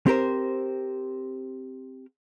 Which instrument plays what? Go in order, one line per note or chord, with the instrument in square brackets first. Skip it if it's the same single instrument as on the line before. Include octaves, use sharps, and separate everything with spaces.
[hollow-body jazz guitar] C4 G4 A#4 C5